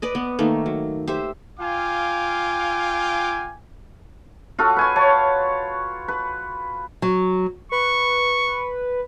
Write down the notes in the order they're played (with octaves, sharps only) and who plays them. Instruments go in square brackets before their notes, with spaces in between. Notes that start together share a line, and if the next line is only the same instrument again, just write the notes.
[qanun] B4 D5 D#5
B3
D#3 A3 A#3
F#3
G4 C5 E5
[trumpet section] F4 F5 G5 G#5 D6
[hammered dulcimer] F4 F#4 A4
B4 G#5 C#6
C#5 A5
B4
[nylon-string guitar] F#3
[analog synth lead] B4 [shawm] C#6